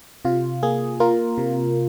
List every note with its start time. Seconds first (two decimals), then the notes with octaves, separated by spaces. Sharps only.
0.25 C3 F4
0.63 A#3 G#4
1.00 A#3 F4 A#4
1.38 C3